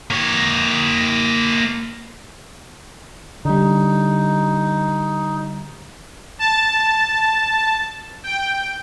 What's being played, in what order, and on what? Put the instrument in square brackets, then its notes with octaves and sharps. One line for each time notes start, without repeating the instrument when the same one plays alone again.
[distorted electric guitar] A#3 C#5
[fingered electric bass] D3 G3 [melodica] D#4
[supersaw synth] A5
G5